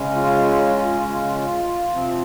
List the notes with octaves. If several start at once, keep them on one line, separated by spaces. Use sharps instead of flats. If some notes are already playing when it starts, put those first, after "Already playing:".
Already playing: C#3 G#3 C#4
F4
F4
F4
F4
C3 F3 C4